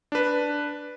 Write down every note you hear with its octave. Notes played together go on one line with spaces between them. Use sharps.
D4 B4